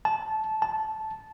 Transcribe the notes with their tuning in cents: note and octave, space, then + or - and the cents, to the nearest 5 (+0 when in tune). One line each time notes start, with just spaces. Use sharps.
A5 -15
A5 -10